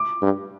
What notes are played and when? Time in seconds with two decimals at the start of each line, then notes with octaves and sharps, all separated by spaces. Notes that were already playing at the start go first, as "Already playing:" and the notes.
Already playing: D6
0.22 G2